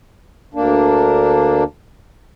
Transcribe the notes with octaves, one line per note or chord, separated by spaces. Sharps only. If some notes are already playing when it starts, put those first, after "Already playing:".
D2 A#3 D4